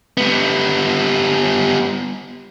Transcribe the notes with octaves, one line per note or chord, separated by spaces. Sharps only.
G3 B3